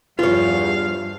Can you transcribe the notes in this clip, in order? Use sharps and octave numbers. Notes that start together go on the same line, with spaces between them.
E2 G2 F3 F4 C#5 F5